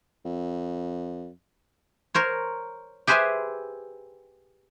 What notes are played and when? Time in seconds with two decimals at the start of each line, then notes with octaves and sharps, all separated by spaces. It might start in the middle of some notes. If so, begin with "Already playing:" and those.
0.25 F2
2.14 A#4 C5 C#5
3.07 G4 G#4 B4 C5 E5 G#5